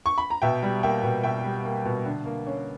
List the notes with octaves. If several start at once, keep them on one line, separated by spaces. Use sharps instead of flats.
C#6
B5
A#5
B2 E5 G5
G3
A#3 E5 G5
B2
B2 E5 G5
G3
A#3
B2
D3
A#3
C#4